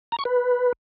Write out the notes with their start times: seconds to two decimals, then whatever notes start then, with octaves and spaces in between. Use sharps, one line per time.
0.12 A#5
0.19 C#6
0.25 B4